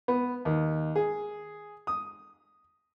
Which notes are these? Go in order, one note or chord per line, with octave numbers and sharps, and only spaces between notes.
B3
D#2
G#4
D#6